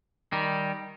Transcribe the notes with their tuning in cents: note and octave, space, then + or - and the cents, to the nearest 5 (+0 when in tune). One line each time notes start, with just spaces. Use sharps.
D#3 +0 G3 +0